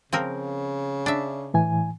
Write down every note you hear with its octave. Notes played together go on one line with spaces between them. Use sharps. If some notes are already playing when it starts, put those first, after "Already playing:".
C#3 F3 C4 A#4
D4 E5
A2 E3 G#5